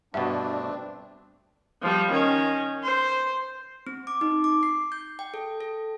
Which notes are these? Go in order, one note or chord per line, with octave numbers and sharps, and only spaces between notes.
G2 B2 A3 C4 D4 E5 F#5
F3 G3
D#3 C#4
C5
C4
D6
D#4
D6
C7
G6
G5
A4
A4